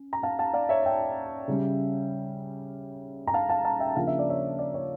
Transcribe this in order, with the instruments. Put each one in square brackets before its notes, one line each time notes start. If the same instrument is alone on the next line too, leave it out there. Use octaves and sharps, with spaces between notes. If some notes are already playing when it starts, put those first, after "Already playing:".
Already playing: [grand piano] C#4
A#5
F5 A5
F5 A5
D5 F5
C#5 E5
E5 G5
C#3 G3 C#4
A#5
F5 A5
F5 A5
F5 A5
E5 G5
C#3 F3 A#3 D4 F5
E5
D5
C#5 E5
D5
C#5